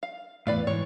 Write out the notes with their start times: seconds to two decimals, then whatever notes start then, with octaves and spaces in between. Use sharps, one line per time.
0.03 F5
0.47 E2 A2 B4 D5 F5
0.67 G#2 E3 C#5